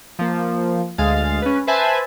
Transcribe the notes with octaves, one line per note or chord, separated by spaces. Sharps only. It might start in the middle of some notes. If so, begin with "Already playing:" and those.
F3 A#3
D2 G#3 G#4 F5 A6
C#4 B4
B4 C5 E5 G#5 A5